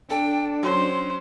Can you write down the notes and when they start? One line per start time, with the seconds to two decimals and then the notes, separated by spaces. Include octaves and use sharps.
0.10 D4 A4 G5
0.63 F#3 C#4 C5 C6